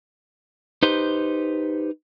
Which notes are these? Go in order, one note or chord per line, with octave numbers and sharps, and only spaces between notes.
D#4 G4 B4 C5